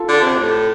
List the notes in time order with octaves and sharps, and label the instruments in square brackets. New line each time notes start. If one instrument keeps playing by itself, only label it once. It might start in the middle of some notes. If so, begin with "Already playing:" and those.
Already playing: [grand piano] F4 A4
[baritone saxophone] D3
C3
A2